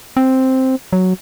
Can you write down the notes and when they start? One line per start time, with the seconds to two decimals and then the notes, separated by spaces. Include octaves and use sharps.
0.17 C4
0.93 F#3